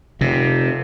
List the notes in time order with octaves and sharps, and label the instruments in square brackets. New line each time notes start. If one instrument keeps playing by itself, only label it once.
[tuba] F1 [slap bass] C3